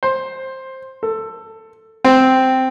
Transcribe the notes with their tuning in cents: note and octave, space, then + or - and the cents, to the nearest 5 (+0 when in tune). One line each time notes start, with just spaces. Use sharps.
C5 +10
A4 +15
C4 -5